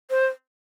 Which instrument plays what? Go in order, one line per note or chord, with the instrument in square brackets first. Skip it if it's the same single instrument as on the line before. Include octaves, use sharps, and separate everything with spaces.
[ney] C5